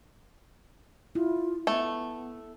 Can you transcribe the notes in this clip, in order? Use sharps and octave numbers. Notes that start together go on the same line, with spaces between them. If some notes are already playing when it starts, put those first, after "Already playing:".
E4 F4
A3 B3